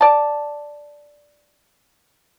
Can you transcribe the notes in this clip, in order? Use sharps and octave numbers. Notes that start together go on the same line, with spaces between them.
D5 A5